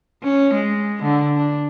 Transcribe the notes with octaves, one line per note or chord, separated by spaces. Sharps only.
C#4
G#3
D3
D4